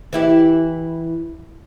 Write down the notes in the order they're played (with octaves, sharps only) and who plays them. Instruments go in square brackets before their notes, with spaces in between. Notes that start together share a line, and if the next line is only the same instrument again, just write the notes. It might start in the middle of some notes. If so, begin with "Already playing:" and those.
[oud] E3 E4 G4